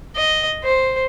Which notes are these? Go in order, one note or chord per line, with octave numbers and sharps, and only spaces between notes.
D#5
C5